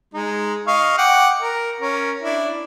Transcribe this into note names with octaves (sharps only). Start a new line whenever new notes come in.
G#3 D#4
D#5 F5 C#6
F#5 G5 D6
A#4
C#4 A#4
D4 E4